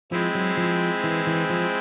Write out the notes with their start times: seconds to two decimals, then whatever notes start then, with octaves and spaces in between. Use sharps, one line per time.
0.12 F3 G#3 C4 E4
0.35 F#3
0.57 F3
1.04 E3
1.27 E3
1.50 F3